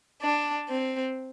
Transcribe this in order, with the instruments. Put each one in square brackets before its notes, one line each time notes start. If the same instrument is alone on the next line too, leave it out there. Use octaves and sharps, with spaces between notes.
[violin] D4
C4